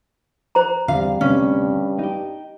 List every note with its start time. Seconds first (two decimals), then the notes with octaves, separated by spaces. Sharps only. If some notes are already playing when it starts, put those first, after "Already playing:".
0.55 C5 A#5
0.88 E2 D3 G3 C4 F5
1.21 D2 G2 C3 C#4
1.99 D#4 G4